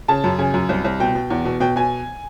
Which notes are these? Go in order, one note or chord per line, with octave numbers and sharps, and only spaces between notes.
C#3 A5
F#2
C#3 G#5
F#2
C2
C2
B2 G5
B2
E2
B2
B2 G5
B2 G#5